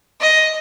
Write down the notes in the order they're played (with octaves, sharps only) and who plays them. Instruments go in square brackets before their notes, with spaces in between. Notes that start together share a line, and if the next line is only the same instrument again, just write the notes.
[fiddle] D#5